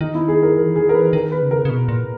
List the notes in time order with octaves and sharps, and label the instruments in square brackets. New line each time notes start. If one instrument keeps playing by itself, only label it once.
[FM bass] D#3 [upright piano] D#4
[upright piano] E4
G#4
A#4
[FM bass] E3 [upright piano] A#4
[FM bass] D#3 [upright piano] G#4
[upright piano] A#4
[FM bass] E3 [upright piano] B4
[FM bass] D#3 [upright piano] A#4
[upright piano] B4
[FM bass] C#3
[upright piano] A#4
[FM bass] C#3
B2
A#2